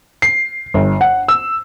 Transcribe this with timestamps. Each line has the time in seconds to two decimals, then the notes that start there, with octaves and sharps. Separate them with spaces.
0.22 C7
0.74 G1
1.01 F#5
1.28 E6